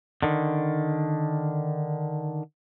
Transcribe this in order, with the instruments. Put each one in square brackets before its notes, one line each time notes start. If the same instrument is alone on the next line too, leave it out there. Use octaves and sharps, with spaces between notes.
[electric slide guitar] D3 D#3